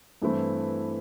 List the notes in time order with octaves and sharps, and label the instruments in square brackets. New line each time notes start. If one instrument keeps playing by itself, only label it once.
[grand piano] G2 E3 A3 C4 E4